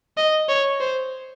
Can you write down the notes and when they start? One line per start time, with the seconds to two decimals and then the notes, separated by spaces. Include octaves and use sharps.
0.17 D#5
0.49 C#5
0.80 C5